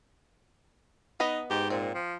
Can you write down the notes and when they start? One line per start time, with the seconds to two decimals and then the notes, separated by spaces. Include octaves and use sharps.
1.20 B3 D#4 B4 D#5
1.50 G#2 G4
1.70 A#2 C4
1.95 F3